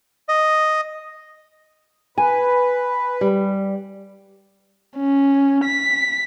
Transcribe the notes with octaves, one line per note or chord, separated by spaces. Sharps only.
D#5
B4 G#5
G3
C#4
B6